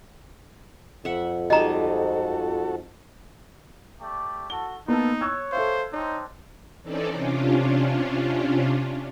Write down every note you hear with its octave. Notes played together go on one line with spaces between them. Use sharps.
F2 E5 F#5
G3 G#3 D#4 F#4 A4 D#5 A#5
A3 G4 D5
F#4 A4 G7
A#3 B3 D#4 A4
C#5 E6 F#6 G#6
A4 C5 E5 F5
C4 D4 D#4 C5 C#5
E3 C4 C#4 D#4 A4 D5
C3 C#4 D4 F4